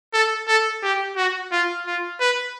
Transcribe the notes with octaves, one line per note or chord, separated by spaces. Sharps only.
A4
A4
G4
F#4
F4
F4
B4